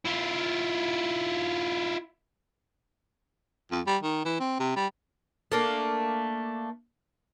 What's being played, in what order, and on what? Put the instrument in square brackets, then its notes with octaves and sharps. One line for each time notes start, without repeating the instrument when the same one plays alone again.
[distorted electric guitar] E4 F4
[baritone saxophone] F2
G3
D#3
E3
C4
C3
G3
[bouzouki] A3 A#3 D4